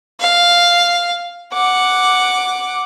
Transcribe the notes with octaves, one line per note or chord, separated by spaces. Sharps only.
F5
F#5 D6